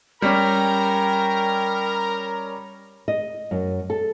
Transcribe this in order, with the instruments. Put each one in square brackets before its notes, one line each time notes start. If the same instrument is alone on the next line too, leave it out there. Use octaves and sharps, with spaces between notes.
[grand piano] G3 C#4 [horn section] A#4 A#5 [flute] G5
[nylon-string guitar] D#5
F#2
A4